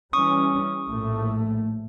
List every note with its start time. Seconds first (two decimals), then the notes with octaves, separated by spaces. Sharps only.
0.13 E3 G3 C#4 C#6 D#6
0.88 A#1 A2 A3